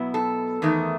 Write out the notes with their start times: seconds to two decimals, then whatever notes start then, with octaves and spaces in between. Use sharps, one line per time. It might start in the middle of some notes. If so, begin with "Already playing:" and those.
Already playing: B2 F#3 B3 E4
0.14 A4
0.62 E2 D#3 A3